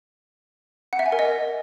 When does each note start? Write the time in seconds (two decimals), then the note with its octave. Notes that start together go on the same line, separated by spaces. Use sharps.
0.93 F#5
0.99 E5
1.06 G#5
1.12 A#4
1.19 D#5